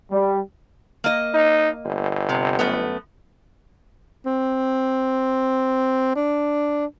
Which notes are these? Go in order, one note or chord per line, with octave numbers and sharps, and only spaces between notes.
G3
A#3 D#5
D#4
G1
C3
F#2 A3 B3
C4
D4